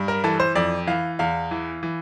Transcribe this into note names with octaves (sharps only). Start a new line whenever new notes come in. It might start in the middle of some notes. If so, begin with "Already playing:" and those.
Already playing: G2
A#4
E3 A4
C5
F2 D5
E3 F5
E2 F5
E3
E3